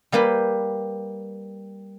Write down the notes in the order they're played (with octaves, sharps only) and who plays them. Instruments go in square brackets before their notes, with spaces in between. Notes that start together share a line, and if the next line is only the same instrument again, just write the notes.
[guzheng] G3 A#3 G4 B4